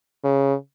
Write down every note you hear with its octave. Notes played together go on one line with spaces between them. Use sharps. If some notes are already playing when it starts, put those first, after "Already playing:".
C#3